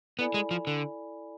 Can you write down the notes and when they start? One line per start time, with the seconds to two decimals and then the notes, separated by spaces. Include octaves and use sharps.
0.19 B3 E4 A4 D5 G#5 B5
0.34 G#3
0.51 F3
0.67 D3